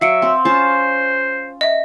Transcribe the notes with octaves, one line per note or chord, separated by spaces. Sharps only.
F#3 E5 F5 C#7 D7
C4
C#4 F4 C5 A5
D#5 E5